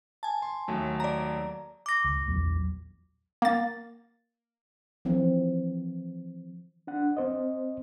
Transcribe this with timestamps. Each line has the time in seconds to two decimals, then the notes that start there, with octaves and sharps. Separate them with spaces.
0.23 G#5 A5
0.42 C6
0.68 D#2 F#3 A3
1.00 D5 A#5
1.86 D6 A#6
2.04 C#2
2.27 A#1 E2 F#3
3.42 A#3 A6
5.05 E3 F3 C4
6.87 D4 F#5
7.17 C4 C5 D#5